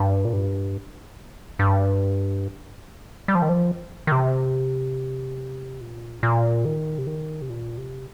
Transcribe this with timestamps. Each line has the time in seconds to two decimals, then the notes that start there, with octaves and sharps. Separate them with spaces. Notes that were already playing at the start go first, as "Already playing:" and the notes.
Already playing: G2
0.25 A#2
0.33 G2
1.59 G2
3.28 G3
3.35 F3
3.42 D#3
3.49 F3
4.07 D#3
4.12 C3
5.81 A#2
6.19 G2
6.23 A#2
6.65 D#3
6.98 C3
7.07 D#3
7.42 C3
7.49 A#2
7.77 C3